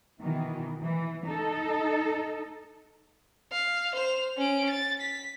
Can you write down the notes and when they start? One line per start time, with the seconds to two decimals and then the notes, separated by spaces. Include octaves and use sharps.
0.21 B2 D#3 E3
0.81 E3
1.25 D#4 A4
3.52 F5
3.95 C5 F7
4.37 C#4 D7
4.70 A6
5.01 B6